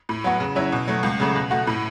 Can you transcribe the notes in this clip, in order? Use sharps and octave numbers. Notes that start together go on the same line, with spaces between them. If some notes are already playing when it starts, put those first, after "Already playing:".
A2
F#3 B3 F#4
C#3
F#3 C#4 E4
B2
F#3 A3
C#2
C#3 F#3 A3
B2
A3 F#4
A2